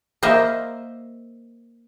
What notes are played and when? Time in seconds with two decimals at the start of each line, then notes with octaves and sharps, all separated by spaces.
0.23 A#3 C5 D#5 E5